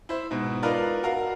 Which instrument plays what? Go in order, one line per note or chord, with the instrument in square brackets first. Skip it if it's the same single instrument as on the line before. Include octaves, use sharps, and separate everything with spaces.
[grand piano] E4 C5
G#2 B2
D#4 F4 A#4 B4 D5
F#4 A#4 F5